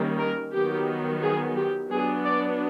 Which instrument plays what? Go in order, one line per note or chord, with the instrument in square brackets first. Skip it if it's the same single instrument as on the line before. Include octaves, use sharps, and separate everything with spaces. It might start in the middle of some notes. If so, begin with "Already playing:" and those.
Already playing: [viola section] D#3 G3 A#3 C#4
A#4
D#3 F#3 B3 G4
G#4
G4
F#3 B3 D4 G#4
D5